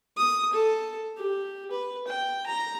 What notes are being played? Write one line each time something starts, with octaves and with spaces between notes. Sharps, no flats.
D#6
A4
G4
B4
G5
A#5